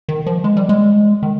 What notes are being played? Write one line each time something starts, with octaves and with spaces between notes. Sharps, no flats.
D#3
F3
G#3
G3
G#3
D#3